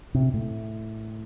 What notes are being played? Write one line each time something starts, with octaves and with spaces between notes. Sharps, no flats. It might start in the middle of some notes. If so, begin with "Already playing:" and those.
C3
A2